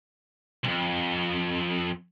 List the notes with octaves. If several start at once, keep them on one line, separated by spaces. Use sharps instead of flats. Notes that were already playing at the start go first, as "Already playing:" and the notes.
C2 F2